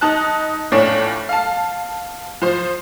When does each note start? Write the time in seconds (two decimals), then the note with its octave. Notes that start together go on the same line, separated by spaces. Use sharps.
0.01 D#4 A5 F#6
0.72 F2 A2 A3 C#4 D4
1.29 F5 A5
2.42 F3 C5